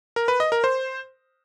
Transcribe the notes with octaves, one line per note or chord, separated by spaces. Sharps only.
A#4
B4
D#5
A#4
C5